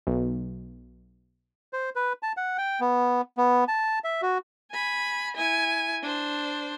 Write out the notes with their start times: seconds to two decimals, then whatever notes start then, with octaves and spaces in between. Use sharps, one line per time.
0.07 B1
1.73 C5
1.95 B4
2.23 A5
2.37 F#5
2.58 G5
2.80 B3
3.37 B3
3.68 A5
4.04 E5
4.22 F#4
4.71 G#5 B5
5.35 E4 G#5
6.03 D4 C5